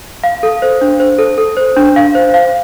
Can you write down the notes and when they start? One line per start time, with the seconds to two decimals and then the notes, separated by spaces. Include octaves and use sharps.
0.24 F5
0.43 A4
0.62 C5
0.81 D4
1.00 C5
1.18 A4
1.38 A4
1.57 C5
1.77 D4
1.96 F5
2.15 C5
2.34 F5